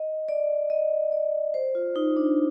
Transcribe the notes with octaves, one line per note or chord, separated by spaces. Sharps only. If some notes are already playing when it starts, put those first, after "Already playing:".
Already playing: D#5
D5
D#5
D5
C5
F4
D#4
D4